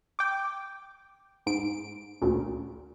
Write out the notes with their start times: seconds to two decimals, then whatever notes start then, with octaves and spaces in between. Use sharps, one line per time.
0.19 G5 D6
1.46 G#2 D7
2.21 D2 A#2 C#3